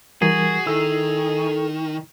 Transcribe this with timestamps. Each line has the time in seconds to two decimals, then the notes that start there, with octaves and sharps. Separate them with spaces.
0.22 E3 G3 F#4 G#4 A#4
0.67 D#3 E4 A4 E6